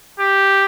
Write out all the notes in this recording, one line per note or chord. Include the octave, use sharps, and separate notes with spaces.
G4